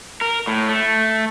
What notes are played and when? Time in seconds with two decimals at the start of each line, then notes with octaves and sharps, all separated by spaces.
0.21 A#4
0.47 A2
0.69 A3